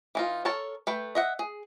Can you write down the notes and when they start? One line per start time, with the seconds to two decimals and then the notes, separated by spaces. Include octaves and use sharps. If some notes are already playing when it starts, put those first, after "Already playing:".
0.15 E3 D#4 F4
0.45 A4 A#4 C#5 A5
0.87 A3 B4 G5
1.15 D#5 E5 F#5
1.39 G#4